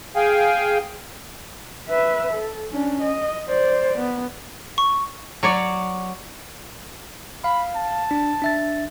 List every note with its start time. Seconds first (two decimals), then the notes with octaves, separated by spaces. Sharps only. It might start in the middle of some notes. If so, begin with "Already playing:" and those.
0.16 G#4 F5 G5 G#5
1.89 B4 E5
2.32 A4
2.72 C#4 D4
3.02 D#5
3.49 C5 D5
3.97 B3
4.78 C#6
5.43 F#3 C#5 D5
7.44 F5 B5
7.75 A5
8.11 D4
8.42 D4 E5 A6